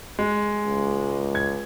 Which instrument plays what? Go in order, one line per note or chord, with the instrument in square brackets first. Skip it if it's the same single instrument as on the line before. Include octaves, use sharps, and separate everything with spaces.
[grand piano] G#3
[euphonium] C#2
[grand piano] G#6